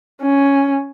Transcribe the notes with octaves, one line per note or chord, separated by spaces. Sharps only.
C#4